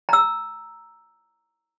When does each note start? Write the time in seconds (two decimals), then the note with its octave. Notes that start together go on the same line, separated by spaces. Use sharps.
0.09 A#5 E6